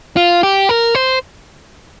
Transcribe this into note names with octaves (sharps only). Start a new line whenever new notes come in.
F4
G4
A#4
C5